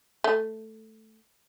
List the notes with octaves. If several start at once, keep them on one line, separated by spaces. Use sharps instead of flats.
A3